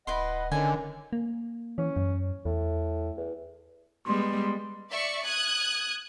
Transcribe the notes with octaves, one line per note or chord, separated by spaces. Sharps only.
D1 E4 B4 D#5 F#5 C6
D3 D#3 C#4 G#5
A#3
E3 C#4
F#2
E2 A2
E2
G3 G#3 B3 C6
D5 E5 C#6
D#6 F#6 G#6